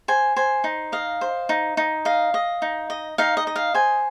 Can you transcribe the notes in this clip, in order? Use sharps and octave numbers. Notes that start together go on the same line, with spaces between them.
C5 G#5
C5 G#5
D#4
D#5 F5
C5
D#4
D#4
D#5 F5
D#5
D#4
D#5
D#4 F5
D#5
D#5
F5
C5 G#5